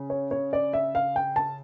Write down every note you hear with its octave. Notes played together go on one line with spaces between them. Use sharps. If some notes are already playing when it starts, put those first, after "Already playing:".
Already playing: C#3
C#5
C#5
D5
E5
F5
G5
A5